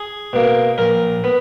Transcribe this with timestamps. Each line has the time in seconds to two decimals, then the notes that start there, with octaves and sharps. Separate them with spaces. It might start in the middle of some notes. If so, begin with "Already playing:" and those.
Already playing: G#4
0.33 B2 A#3
0.78 A#1 A#4
1.24 B3